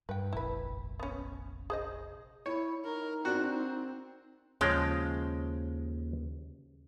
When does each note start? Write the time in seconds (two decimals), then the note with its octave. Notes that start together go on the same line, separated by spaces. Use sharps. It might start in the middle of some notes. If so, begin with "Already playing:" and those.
0.09 G2 B4 G5
0.33 F1 A#1 E4 B4
0.99 B3 C#4
1.70 G#4 C5 D#5
2.46 E4 C#5
2.85 D#4 A#4
3.25 C4 D4 F#4
4.61 D#2 C#3 F3 G#3 C#4 G5